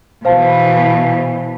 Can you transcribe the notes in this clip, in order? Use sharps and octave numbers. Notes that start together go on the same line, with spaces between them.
B2 E3 C5 F5 A5